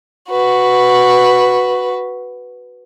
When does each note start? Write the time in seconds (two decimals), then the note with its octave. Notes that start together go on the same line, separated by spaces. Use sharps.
0.29 F#4 B4